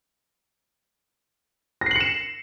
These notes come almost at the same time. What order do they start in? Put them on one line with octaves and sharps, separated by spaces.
A#6 C7 F#7 C#7 E7